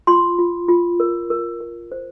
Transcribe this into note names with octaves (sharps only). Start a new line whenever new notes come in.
F4 C6
F4
F4
A#4
A#4
A#4
C5